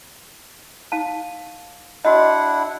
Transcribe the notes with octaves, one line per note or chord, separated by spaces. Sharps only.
D#4 F5 A5
D4 E4 F#4 D#5 F#5